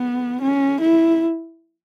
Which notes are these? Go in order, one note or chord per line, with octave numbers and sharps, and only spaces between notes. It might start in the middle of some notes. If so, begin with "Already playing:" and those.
Already playing: B3
C#4
E4